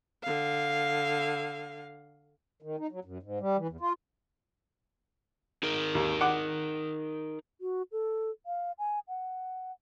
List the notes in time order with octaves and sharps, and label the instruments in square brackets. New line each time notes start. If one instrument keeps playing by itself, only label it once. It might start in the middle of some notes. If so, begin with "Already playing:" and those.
[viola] D3 F5
[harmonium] D#3
D#4
F#3
F#2
G#2
G3
E3
E2
F4
[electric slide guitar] D#4 G#4 A#4
[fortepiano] D#2
F#5 D6
[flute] F#4
A4
F5
G#5
F#5